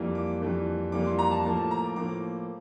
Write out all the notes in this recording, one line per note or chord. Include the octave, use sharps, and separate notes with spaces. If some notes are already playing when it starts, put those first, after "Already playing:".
Already playing: F2 E3 G3 A#3
D6
F2 E3 G3 A#3
F2 E3 G3 A#3 D6
C6
A#5
A5
A2 F3 A#3 A5
A5
A#5
D6
A2 F3 A#3 D6